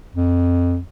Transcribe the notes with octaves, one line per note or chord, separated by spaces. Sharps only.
F2